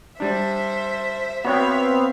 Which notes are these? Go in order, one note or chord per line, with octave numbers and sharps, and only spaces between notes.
G3 D4 C5 E5
B3 C4 F#4 C#5 E5 F5 G5